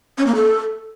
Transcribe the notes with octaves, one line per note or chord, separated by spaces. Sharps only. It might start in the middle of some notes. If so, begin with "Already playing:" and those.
C#4
A#3
A4